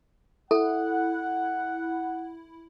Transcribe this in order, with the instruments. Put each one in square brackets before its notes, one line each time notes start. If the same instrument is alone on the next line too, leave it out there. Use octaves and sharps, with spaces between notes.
[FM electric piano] E4 [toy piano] A4 [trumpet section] F#5